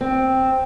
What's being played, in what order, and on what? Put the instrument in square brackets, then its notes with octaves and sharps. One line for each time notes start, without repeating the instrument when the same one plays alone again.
[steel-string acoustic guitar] C4